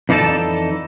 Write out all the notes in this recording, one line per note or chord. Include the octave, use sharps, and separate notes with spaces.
F2 E3 D#4 A4 D5 A5